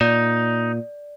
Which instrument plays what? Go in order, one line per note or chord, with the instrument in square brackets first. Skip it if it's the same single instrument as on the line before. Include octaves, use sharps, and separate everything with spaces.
[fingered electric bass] A#2 [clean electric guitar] D#4 [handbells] D5